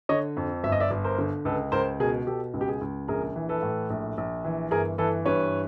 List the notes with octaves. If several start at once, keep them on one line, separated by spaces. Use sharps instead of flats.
D3 C#5 D#5
F2
G1 E5
D#5
D5 E5
G1
A#4 C5
D3
C#2 A4 B4
C#2 A#4 C5
B2 G#4 A#4
B2 G4 A4
C#2
G4
G#4
C#2
A#1 G#4 A#4
E3
A4 B4
A2
A#1
A#1
E3
G1 G#4 A#4
E3 A4 B4
G2 B4 C#5